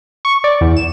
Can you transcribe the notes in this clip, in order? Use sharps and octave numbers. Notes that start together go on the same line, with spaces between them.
C#6
D5
E2
E7